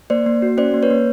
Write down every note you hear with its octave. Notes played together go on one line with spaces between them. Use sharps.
A#3 C5 D5
A#3
F#4
C#4 C5 D5
A#3
B4 C#5
A#3